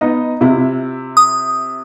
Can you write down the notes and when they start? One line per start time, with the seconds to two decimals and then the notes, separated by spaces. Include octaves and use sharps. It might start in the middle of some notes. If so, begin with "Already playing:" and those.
0.01 B3 D#4 D#5
0.41 C3 E4 F4
1.17 D#6